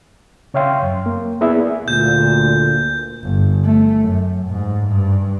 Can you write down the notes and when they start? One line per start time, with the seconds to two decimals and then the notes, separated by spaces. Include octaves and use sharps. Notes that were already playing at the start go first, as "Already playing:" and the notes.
0.54 C#3 C#5 E5 F5 G5 C6
0.83 F#2
1.06 A#3
1.41 B3 E4 G#4 D5 E5
1.88 D2 A#2 G6
3.22 G1
3.64 A3
4.01 F#2
4.47 G#2
4.86 G2